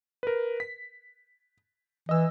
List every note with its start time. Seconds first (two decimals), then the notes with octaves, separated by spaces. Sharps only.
0.23 A#4 B4
0.60 B6
2.09 E3 D#5 E6